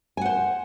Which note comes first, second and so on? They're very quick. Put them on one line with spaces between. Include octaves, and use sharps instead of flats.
G#5 F#5 C5